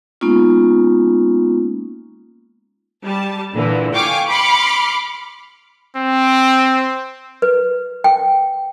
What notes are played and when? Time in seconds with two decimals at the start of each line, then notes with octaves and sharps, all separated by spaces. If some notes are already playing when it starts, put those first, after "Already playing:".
0.21 G#3 A#3 B3 C#4 D#4 F4
3.04 G3 A5
3.53 A#2 D3 E3
3.95 F5 G5 G#5 C#6 D6
4.28 B5 C6 D6 F6 C#7
5.96 C4
7.42 B4
8.04 G5